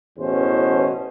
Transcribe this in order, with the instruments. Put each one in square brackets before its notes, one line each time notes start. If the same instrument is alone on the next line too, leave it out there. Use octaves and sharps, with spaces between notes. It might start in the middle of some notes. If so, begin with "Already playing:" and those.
[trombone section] A1 E2 B2 C#4 C5